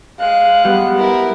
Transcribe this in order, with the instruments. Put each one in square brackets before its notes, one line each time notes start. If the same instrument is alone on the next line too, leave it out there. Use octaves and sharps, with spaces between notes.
[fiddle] G#3 F#6 [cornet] F5
[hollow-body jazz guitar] G3 [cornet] B3
[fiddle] E4 A#4